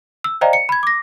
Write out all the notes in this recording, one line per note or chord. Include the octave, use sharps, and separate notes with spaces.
E6
C5 D5 D#5 F5 G5 A#5
C#7
B5 G#6
D6 A#6